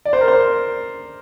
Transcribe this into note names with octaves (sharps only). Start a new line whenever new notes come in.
D5
C5
A#4
C5